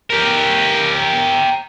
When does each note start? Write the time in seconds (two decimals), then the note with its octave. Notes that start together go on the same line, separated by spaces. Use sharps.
0.10 G4 A#4